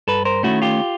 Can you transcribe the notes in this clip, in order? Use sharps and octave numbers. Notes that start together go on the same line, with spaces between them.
G2 A4 B4
A#4 C5
D#3 F#3 A3 C#4 E4 F#4
F4 G4